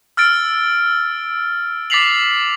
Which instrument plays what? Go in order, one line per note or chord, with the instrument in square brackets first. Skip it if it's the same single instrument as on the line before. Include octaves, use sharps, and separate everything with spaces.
[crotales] E6 F6 A6 D7
D6 A6 B6 C7 F7 F#7